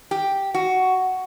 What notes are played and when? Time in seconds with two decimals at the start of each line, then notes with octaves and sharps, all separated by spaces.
0.11 G4
0.54 F#4